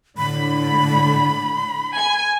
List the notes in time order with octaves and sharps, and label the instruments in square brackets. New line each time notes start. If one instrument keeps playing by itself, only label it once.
[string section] A2 D3 [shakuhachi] B5
[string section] G#5